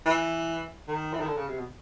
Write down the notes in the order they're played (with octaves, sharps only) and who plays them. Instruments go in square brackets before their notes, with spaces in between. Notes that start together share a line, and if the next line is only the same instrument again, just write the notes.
[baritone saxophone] E3
D#3
E3
D#3
D3
C#3
C3
B2